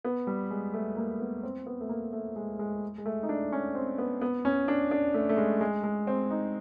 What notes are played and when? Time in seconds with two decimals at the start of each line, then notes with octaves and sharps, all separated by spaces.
0.05 B3
0.27 G3
0.50 G#3
0.74 A3
0.97 A#3
1.20 B3
1.43 C4
1.66 B3
1.81 A3
1.89 A#3
2.13 A3
2.36 G#3
2.59 G#3
2.98 G#3
3.06 A3
3.23 D#4
3.29 D4
3.52 C#4
3.75 C4
3.98 B3
4.21 B3
4.45 C#4
4.68 D4
4.91 D4
5.14 A3
5.29 A3
5.37 G#3
5.61 G#3
5.83 G#3
6.07 C4
6.30 D#4